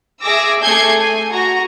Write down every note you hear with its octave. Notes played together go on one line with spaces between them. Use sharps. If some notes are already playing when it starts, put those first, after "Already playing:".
G#4 E5 D6 E6 A#6
A3 G#4 G6 G#6 C7 C#7
G#5
F#4 A#5 A#6